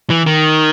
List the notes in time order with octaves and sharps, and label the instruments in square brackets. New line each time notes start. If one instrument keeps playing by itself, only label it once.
[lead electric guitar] E3
D#3